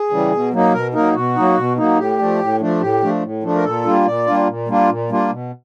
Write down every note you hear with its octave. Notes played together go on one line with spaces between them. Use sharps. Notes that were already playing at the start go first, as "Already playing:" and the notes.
Already playing: G#4
C#3 E3 G3
B2
F#3 A#3 D#4
B2 A#4
F#3 A#3 D#4 A#4
B2 F#4
F#3 A#3 D#4
B2
F#3 A#3 D#4
A2 G4
F3 A3 D4
A2
F3 A3 D4
A2 G4
F3 A3 D4
A2
F3 A3 D4
A#4
A#2 A4
G3 A#3 D4 F4
A#2 D5
G3 A#3 D4 F4
A#2
G3 A#3 D4 F4
A#2
G3 A#3 D4 F4
B2